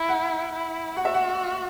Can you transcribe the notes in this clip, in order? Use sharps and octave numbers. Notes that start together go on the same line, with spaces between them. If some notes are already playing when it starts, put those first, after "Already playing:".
Already playing: E4
F#5
E4
F#4 F#5
E5
F#5